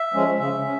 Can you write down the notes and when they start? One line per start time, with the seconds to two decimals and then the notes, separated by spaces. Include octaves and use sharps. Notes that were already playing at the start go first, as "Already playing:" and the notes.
Already playing: E5
0.14 F3 G#3 C#4
0.39 C#3 E5
0.64 C#4